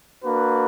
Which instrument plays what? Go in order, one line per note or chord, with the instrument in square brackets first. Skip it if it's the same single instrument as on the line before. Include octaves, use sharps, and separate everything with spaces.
[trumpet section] A#3 D4 F#4 B4